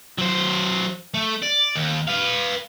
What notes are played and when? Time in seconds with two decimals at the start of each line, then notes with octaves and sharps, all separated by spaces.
0.18 F#3 C5
1.14 A3
1.43 D5
1.76 D#2
2.08 B4 F5